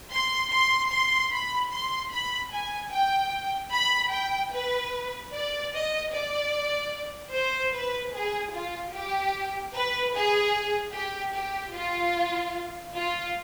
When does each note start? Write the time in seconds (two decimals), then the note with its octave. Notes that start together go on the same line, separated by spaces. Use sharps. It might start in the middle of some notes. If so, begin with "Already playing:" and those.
0.11 C6
0.53 C6
0.92 C6
1.32 B5
1.73 C6
2.13 B5
2.53 G#5
2.92 G5
3.74 B5
4.13 G5
4.53 B4
5.33 D5
5.74 D#5
6.14 D5
7.33 C5
7.74 B4
8.14 G#4
8.54 F4
8.94 G4
9.75 B4
10.15 G#4
10.95 G4
11.35 G4
11.76 F4
12.95 F4